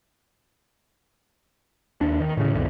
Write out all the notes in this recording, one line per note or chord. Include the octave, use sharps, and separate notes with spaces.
D#2 D4
D#3
A2 C#3
B1 F2 D3